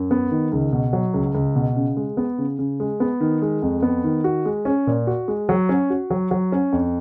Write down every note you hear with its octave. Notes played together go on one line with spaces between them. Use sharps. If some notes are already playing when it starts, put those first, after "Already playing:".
Already playing: F#2
B3
D#3
C#2
B2
F#3
C#2
C#2
B2
C#3
G#3
B3
C#3
C#3
G#3
B3
D#3
G#3
F2
B3
D#3
F#4
G#3
C#4
A#2
F#4
G#3
F#3
C#4
F#4
F#3
F#3
C#4
F2